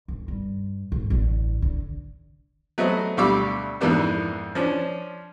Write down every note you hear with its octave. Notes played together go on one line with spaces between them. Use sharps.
G1
G2
G#2
A1 D3
D3
F#3 A3 B3 C4 D#5
D2 B2 G3 F5 D6 E6
F2 G#2 E3 A#3 B3 D4
F3 C#4 D4